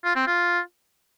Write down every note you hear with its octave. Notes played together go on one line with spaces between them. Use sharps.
F4
C4
F4